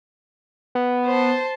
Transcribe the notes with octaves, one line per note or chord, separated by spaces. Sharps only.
B3
C5 A5